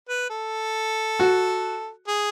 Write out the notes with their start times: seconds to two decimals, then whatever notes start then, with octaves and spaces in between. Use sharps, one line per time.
0.09 B4
0.30 A4
1.20 F#4
2.08 G#4